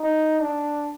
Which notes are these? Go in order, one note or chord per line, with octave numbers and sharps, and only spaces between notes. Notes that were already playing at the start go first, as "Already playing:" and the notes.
Already playing: D#4
D4